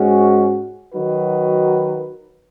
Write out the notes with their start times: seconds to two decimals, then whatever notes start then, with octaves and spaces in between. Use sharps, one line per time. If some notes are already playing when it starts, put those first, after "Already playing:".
Already playing: G#2 G#3 C#4 F#4
0.93 D#3 F#3 D#4 F#4 B4